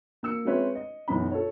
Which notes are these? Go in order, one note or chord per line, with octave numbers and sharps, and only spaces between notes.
A#3 E6 C#7
G#3 C4 C#4 B4 C#5 E5
D#5
B1 F#2 E3 B3 C#4 B5
A4 C#5